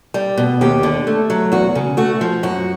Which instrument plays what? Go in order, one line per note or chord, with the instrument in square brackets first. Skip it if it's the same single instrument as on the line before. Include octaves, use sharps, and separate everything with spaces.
[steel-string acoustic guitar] G3
B2
D#2 G4
D3
A3
F#3
E2 F#4
C#3
A3 F#4
F3
F#2 F#4